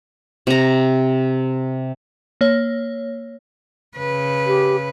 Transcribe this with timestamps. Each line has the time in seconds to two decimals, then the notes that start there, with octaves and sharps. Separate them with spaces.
0.47 C3 A#5
2.41 A#3 C#5
3.96 C#3 B4
4.47 G4